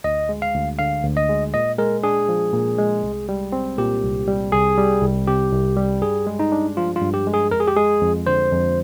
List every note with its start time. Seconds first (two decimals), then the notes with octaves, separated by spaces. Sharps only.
0.04 D2 D#5
0.29 G#3
0.42 F5
0.54 D2
0.79 D3 F5
1.03 D2
1.17 D#5
1.29 G#3
1.54 A#2 D#5
1.79 G#3 A#4
2.04 D4 G#4
2.29 F3
2.53 A#2
2.78 G#3
3.03 C2
3.29 G3
3.52 C4
3.78 A#2 G4
4.03 C2
4.28 G3
4.52 C2 G#4
4.78 G3
5.02 C2
5.27 C3 G4
5.52 C2
5.77 G3
6.02 G2 G#4
6.27 G#3
6.39 D#4
6.52 D4
6.77 F3 F4
6.96 F4
7.01 G2
7.14 G4
7.27 G#3
7.34 G#4
7.51 F2 A#4
7.60 G#4
7.68 G4
7.77 G#3 G#4
8.02 F2
8.27 D3 C5
8.52 F2